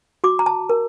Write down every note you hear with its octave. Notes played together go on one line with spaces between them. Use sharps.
F#4 D6
A#5
A5
A#4